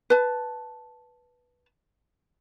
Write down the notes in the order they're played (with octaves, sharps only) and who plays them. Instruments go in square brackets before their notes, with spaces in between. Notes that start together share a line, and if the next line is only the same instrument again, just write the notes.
[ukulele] B4 A5